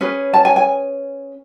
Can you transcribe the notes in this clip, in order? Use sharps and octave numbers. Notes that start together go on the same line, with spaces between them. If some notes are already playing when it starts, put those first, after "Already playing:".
C#4 G#4 B4
A5
G#5
G#5